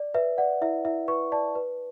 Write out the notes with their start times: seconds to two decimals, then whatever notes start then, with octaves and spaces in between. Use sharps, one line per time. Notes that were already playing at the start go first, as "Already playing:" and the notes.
Already playing: D5
0.14 B4 E5
0.38 D5 F#5
0.61 E4 E5
0.85 E4 E5
1.08 B4 C#6
1.32 D5 A5
1.55 B4